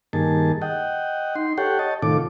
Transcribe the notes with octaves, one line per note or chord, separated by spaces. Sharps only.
G2 D#3 A#3 G#4 A5
D#5 F#5 G5
D#4 C6
G4 A4 C#5 F#5 G5
C#5 D#5 A5
A2 C3 D#3 F4 A4 D6